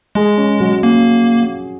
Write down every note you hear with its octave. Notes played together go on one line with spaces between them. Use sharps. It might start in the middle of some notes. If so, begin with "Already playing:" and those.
G#3 G#4
C#4
F#3
A#3 C#4